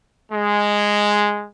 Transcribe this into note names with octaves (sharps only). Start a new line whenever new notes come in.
G#3